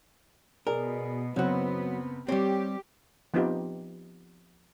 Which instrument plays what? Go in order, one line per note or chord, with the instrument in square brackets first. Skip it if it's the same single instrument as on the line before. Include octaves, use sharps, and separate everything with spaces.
[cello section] B2 [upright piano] G#4 D5 [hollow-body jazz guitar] A#4
[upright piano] F#1 C4 [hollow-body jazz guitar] F#3 F#4 [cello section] B3
[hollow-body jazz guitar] G3 C4 [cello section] G4 [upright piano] C#5
[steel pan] F3 B3 C4 D#4 F4 G4